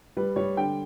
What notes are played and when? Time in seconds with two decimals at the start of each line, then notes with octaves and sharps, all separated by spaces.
0.17 G3 B4
0.36 G3 C#5
0.57 D3 G5